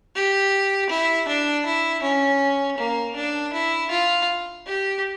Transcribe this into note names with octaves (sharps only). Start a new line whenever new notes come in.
G4
E4
D4
E4
C#4
A#3
D4
E4
F4
G4